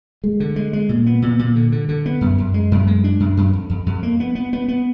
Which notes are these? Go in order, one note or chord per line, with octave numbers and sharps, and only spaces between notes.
G#3
D3
G#3
G#3
A#2
B3
A#2
A#2
D3
D3
D3
B3
F#2
F#2
G#3
F#2
G#3
D4
F#2
F#2
F2
F2
F2
A#3
B3
B3
B3
B3